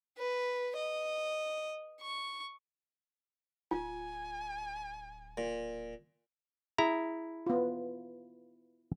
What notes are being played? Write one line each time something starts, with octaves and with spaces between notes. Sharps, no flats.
B4
D#5
C#6
D1 F4 G#5
A#2
E4 G#4 A#5
B3 F4